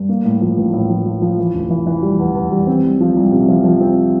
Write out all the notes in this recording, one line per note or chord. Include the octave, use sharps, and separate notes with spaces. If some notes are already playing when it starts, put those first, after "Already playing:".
Already playing: G2
A#3
A2
F3
A1
A2
F3
F3
F3
E3
F1
E3
E3
G3
E2
E2
G3
C4
C2
F3
C2
C3
F3
F3
C4